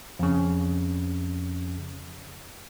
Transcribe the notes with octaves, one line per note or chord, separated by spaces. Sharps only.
F2 C#3